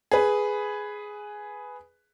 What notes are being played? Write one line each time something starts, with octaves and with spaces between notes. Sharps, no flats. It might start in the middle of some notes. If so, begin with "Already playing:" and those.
G#4 B4